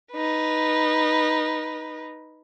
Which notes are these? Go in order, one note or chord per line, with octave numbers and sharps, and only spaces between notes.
D#4 B4